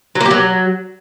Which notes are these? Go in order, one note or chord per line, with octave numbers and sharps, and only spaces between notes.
F#3
A#3
G4
F#3